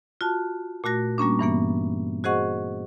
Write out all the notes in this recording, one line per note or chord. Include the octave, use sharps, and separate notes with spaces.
F4 F#4 A5
A#2 A3 F#4 A#6
G3 A#3 C#4 D4
G2 E3 A#3 B3
F#4 G#4 C5 D#5 F#5 C#6